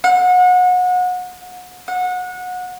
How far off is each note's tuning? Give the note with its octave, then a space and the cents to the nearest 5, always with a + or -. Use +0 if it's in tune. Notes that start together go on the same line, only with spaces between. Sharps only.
F#5 -30
F#5 -25